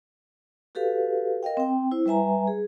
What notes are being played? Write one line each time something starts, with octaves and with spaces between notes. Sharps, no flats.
F#4 G4 A4 B4 F5
A#4 D#5 F5 G5
C4 G5
E4 C5
G3 B4 E5 G#5 A#5
G#4